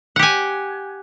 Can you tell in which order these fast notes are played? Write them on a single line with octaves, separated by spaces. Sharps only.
F#5 G4 G#5